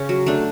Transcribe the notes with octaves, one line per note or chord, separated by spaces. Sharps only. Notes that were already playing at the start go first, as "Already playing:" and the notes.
Already playing: C#3 C#4
F#3
A3 D4